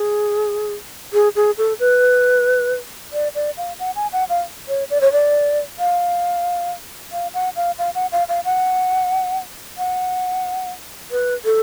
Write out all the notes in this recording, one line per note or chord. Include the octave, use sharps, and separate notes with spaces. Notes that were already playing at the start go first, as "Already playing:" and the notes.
Already playing: G#4
G#4
G#4
A4
B4
D5
D5
F5
F#5
G#5
F#5
F5
C#5
D5
C#5
D5
F5
F5
F#5
F5
F5
F#5
F5
F5
F#5
F#5
B4
A4